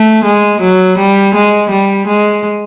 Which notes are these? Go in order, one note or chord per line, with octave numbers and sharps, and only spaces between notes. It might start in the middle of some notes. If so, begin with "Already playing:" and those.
Already playing: A3
G#3
F#3
G3
G#3
G3
G#3